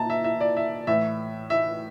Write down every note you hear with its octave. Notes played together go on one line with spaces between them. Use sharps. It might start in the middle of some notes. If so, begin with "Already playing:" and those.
Already playing: A#2 A5 A#5
E5
E5
D5
E5
A2 E3 E5
E5